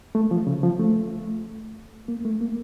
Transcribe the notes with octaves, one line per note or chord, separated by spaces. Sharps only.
A3
F3
C#3
F3
A3
A#3
A3
A#3